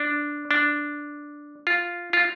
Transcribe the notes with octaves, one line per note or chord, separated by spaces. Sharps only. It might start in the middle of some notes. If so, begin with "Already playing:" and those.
Already playing: D4
D4
F4
F4